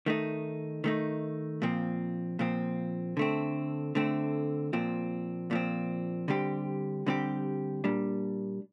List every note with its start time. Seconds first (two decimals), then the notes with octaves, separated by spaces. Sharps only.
0.06 D#3 A3 D#4
0.84 D#3 A3 D#4
1.62 A#2 F3 C4
2.39 A#2 F3 C4
3.17 D3 A3 C4
3.95 D3 A3 C4
4.73 A#2 F3 C4
5.51 A#2 F3 C4
6.28 D3 G3 C4 G4
7.06 D3 G3 C4 G4
7.84 A#2 G3 D4